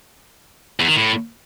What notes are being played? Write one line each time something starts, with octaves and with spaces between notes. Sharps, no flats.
E2
D#3
A2